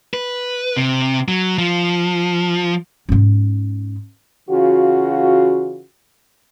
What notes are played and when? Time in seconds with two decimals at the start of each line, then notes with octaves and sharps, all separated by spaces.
0.14 B4
0.77 C3
1.28 F#3
1.58 F3
3.09 G#2 C#4
4.49 C#3 E3 F4 F#4